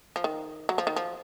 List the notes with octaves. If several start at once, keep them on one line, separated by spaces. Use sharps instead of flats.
F3
D#3
F#3
F3
D#3
F3